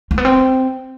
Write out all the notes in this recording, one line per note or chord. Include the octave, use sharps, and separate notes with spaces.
A#3
B3
C4